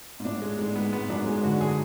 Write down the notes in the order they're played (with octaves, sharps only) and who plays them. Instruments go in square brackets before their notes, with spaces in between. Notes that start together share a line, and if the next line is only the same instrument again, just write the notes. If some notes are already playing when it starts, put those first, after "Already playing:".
[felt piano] G#2
[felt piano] A2 [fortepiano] D4
[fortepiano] G#3
[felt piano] G#2 [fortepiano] G#3
[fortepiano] B3
[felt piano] G#2 [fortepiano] B3
[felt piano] F#2 [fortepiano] D4
[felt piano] G#2 [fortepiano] G#3
[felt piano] D3 [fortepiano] F#4
[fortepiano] G#4